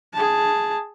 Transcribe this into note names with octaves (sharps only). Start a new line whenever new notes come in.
G#4 A5